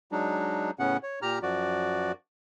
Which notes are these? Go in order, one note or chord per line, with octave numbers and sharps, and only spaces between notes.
F#3 G#3 D4 D#4
A2 C#3 B3 C#4 F#5
C#5
A#2 G4 A#5 F6
F#2 F3 F#4 D5